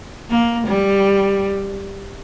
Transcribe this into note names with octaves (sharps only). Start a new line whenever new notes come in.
A#3
G3